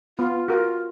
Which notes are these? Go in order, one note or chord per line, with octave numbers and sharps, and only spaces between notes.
B3 F4
F4 F#4 A#4